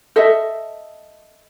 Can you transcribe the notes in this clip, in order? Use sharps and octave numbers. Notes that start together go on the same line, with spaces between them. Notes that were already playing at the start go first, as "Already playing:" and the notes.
A4 D#5 E5